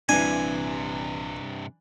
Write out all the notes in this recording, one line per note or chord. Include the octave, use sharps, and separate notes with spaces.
A#1 G2 C3 E3 G3 C4 D4 G#5